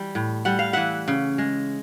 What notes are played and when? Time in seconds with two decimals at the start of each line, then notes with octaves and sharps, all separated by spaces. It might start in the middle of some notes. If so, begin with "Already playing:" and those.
Already playing: E3 G3
0.15 A2
0.45 G3 F#5
0.59 F5
0.73 E3 E5 F#5
1.08 C#3
1.38 G#3